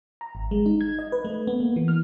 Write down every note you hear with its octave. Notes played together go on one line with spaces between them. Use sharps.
A#5
G#1
G#3
D#4
G#6
D#5
B4
A3
B3
A#3
E3
F6